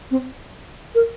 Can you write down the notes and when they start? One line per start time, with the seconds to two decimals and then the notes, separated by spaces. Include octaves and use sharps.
0.11 C4
0.95 A#4